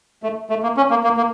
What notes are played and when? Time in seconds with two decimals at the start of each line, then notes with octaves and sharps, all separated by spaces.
0.23 A3
0.50 A3
0.63 A#3
0.77 C#4
0.90 A#3
1.04 A#3
1.17 A#3